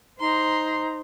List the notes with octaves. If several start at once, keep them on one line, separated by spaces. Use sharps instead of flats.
D#4 C5 A#5 C6